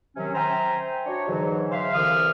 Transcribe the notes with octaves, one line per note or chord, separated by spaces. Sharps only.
C3 D#3 F#3 C#4
C5 E5 G5 G#5 A#5
D4 F#4 C#5
G#2 D3 E3 F#3
C5 E5 F5
C2 D3 E3 D#6 F6